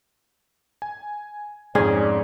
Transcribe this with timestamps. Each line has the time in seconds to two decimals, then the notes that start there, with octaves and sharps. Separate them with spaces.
0.82 G#5
1.75 F2 G#2 C#4 G#4 D5